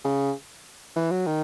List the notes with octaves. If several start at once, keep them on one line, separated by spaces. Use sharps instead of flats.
C#3
E3
F#3
D#3